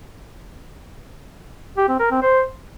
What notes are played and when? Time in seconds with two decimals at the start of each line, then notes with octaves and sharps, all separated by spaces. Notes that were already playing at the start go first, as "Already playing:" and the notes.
1.77 G4
1.88 C4
2.00 A#4
2.11 C4
2.22 C5